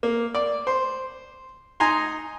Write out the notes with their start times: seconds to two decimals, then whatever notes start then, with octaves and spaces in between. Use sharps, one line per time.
0.03 A#3
0.35 D5
0.67 C5
1.80 D#4 G#5 A#5 C6